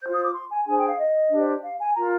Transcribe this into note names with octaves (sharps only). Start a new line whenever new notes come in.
F4 C5 G6
D#6
D6
C6
G#5
D4 G#4 C5 G#5
G5
F5
D#5
D4 G4 C5
F5
G#5
F4 A#4 A#5